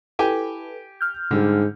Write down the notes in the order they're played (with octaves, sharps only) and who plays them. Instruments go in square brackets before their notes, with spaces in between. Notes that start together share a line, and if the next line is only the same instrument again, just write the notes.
[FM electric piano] E4 A4 B4 [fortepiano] G4 G5 G#5
[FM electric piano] F6 G6
[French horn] G#2 [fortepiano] D3 G3